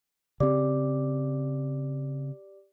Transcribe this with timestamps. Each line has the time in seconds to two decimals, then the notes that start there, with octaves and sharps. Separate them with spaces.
0.40 C#3 C4 G4 D5 D6